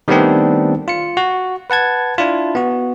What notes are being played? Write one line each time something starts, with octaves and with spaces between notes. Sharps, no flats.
D#3 G3 A3 B3 C4 D4
F4 C#7
F#4
B4 F#5 A5 G#6
D4 E4 F4
B3 F#4